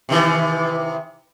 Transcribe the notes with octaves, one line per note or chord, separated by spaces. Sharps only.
C3 D#3 E3